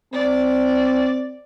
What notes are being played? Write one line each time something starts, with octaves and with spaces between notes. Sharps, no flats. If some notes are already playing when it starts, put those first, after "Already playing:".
C4 D5